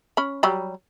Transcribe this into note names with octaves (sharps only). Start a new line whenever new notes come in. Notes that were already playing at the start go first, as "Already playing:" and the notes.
C#4 B5
F#3 G3 B5